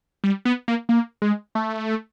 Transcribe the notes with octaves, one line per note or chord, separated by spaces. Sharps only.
G3
B3
A#3
A#3
G#3
A3